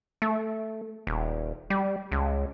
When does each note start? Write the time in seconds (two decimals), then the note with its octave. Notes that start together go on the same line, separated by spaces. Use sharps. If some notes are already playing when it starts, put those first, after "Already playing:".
0.22 A3
1.07 D#1
1.70 G3
2.12 C#2